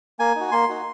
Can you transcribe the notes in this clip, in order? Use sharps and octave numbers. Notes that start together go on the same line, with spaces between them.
A#3 G#5
D#4 F#4
A#3 C6
D#4 F#4